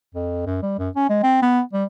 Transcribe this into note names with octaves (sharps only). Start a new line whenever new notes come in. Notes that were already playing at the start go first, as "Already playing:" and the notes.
F2
F#2
G3
F#2
C#4
G#3
C4
B3
G3